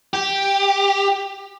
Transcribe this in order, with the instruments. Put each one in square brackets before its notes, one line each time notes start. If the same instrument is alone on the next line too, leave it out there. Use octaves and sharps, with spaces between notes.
[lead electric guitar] G4